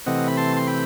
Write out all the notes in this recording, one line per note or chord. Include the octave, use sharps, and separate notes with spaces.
C3 E3 A3 C4 D#5 F#5
B5
A5 C6
C6
G5 B5